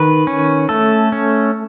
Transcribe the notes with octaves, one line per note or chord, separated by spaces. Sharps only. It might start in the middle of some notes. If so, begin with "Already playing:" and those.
Already playing: D#3 B4
C#4
A3 A4
C#4